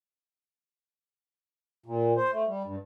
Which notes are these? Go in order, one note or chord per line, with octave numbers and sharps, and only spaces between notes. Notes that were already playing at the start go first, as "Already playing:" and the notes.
A#2
C5
A3
G3
G2